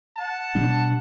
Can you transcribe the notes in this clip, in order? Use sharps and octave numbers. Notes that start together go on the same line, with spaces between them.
F#5 A5
B2 G3 D4